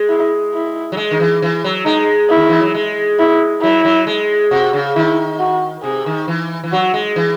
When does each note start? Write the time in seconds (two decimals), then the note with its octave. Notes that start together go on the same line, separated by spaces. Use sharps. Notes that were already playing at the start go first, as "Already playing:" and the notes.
Already playing: G#3
0.09 E4
0.54 E4
0.92 F#3
0.97 G#3
1.11 D#3
1.20 E3
1.42 E3
1.64 F#3
1.86 G#3 D#4
2.30 E4
2.36 D#3
2.49 E3
2.61 F#3
2.75 G#3
3.19 E4
3.62 F#3 E4
3.85 F#3
4.07 G#3
4.51 C3 F#4
4.73 C#3
4.96 D#3 E4
5.40 F#4
5.83 C3 G#4
6.06 D#3
6.28 E3
6.64 E3
6.72 F#3 F#4
6.94 G#3
7.16 E3